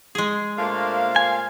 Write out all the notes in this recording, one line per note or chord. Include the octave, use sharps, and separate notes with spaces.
G#3 G#4
A#2 A3 A#3 D4 C5 F5
G#5